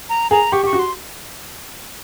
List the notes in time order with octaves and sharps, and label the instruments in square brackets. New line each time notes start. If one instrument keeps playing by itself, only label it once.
[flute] A#5
[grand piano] G#4 [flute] A#5
[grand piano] G4 [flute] C#6
[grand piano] G4 [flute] C#6
[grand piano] F#4
[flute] C6